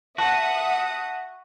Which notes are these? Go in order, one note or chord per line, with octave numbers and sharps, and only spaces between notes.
F#4 E5 F#5 A5 D#6